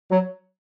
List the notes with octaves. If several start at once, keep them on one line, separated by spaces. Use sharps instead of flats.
F#3